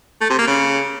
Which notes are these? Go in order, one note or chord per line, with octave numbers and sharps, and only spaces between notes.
A3
C3
A#3
C#3